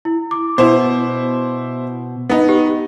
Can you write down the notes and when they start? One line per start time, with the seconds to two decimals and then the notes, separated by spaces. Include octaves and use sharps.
0.05 E4
0.31 D6
0.58 B2 E4 C5
2.29 B3 D#4
2.49 G4